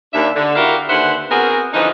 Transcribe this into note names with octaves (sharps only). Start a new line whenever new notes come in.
D#2 D4 E5
D3
E4 F#4 G4 A#4 E5 F5
D#2 D3 B4 C5 E5 F#5
B3 C4 F#4 G#4 A#4
D3 E3 F3 C#4 D#4